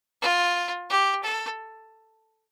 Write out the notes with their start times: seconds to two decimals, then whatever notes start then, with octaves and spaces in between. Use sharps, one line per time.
0.22 F4
0.90 G4
1.23 A4